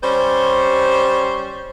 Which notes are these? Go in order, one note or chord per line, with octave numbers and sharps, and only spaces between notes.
G3 C#4 C5